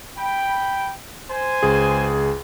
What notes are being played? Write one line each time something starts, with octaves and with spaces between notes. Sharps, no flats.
G5 B5
C5 G#5
C#2 G#4